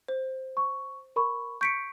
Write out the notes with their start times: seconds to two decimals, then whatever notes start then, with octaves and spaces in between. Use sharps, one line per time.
0.08 C5
0.57 C#6
1.16 A#4 B5 C#6
1.61 C#6 G6 B6 C#7 D7